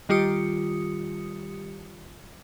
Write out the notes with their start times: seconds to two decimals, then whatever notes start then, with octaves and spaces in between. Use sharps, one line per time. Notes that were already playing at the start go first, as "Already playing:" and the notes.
0.09 D#3 G3 F4 G4 D#6 C#7